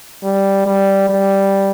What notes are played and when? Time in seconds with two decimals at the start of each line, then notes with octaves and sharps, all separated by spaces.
0.24 G3
0.66 G3
1.10 G3